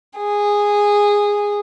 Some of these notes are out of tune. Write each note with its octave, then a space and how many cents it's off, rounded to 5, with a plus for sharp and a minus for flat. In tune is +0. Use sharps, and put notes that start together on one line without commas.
G#4 -10